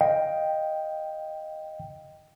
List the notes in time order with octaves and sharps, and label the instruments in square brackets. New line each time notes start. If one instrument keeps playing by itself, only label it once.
[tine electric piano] D#5 F5 G5